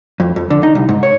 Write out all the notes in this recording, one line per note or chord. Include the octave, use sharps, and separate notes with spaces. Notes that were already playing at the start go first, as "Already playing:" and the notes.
F2
F2
D3
D#4
C2
G#2
C#5